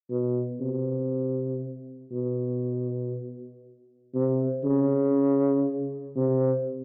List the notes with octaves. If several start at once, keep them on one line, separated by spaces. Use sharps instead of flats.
B2
C3
B2
C3
C#3
C3